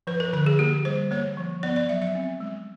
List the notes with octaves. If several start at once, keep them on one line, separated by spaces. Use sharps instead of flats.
F3 B4
A#4
D3 A#4
G#4
A#3 G4
G3 C5
A#3 C#5
F3
B3 D5
D5
F#3 E5
E5
C4
G#3